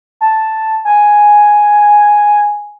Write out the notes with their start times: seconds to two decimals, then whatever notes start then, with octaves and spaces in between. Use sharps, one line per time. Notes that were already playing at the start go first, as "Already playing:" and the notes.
0.21 A5
0.85 G#5